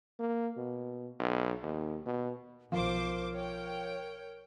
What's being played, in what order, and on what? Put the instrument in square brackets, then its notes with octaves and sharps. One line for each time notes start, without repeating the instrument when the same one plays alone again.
[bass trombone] A#3
B2
B1
D#2
B2
[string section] B1 C5 D6 [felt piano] F3 [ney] A#4
[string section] C#5 G5